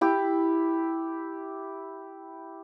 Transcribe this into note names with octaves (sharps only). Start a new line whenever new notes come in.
E4 G4